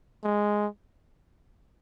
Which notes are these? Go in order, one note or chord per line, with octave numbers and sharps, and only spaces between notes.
G#3